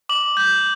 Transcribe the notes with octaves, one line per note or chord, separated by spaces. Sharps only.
D6 F#7
G6